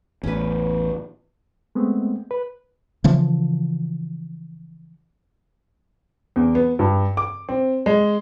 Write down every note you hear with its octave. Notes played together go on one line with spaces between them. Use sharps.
A1 E2 C#4 B4
G#3 A3 B3 C4
B4
C#3 E3 F3
E2
B3
G2
D6
C4
G#3